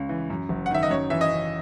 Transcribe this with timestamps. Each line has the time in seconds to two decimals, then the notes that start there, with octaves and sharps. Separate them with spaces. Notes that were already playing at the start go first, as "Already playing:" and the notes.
Already playing: C#2 C#3
0.09 E3
0.30 F#2
0.49 F#1
0.66 F#5
0.71 D#3 E5
0.83 D#5
0.90 F#2 C#5
1.10 E3 E5
1.21 D#5
1.31 C#3